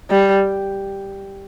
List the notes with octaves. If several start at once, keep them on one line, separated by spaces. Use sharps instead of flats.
G3